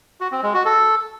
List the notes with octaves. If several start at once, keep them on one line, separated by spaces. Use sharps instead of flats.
F#4
C4
G#3
F#4
A4